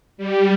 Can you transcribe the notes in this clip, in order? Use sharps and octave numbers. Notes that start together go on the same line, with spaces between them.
G3